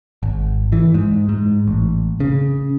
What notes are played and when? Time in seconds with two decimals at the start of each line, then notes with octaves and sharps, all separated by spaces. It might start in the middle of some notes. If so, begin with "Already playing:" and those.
0.23 G#1
0.72 E3
0.94 G#2
1.29 G#2
1.68 A1
2.20 C#3